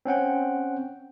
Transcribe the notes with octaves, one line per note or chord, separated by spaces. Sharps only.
C4 C#4 F#5 G5